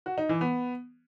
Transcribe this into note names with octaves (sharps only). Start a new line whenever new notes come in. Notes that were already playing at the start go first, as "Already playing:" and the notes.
F#4
D#4
E3
B3